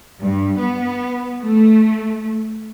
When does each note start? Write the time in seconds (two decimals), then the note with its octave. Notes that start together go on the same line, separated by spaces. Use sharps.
0.21 G2
0.59 B3
1.42 A3